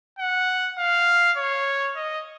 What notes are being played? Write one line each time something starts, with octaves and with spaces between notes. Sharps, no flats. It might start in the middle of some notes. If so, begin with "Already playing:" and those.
F#5
F5
C#5
D#5